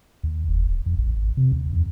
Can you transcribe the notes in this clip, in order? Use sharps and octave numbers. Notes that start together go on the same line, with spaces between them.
D#2
F1
D1
F2
A1
G#1
C3
D#2
F2